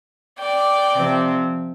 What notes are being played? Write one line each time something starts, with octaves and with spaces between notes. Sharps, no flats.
D5 G5
C3 F3 C4